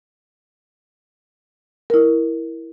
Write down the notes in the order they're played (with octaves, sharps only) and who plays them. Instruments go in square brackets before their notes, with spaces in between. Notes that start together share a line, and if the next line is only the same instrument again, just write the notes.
[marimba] E4 A#4